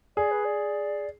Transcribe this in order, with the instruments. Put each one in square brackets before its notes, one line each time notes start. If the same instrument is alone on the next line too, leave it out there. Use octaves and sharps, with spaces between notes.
[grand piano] G#4 [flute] D5
[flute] B4
D5